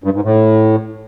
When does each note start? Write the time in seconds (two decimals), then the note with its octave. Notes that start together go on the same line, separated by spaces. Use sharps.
0.04 G2
0.14 G#2
0.24 A2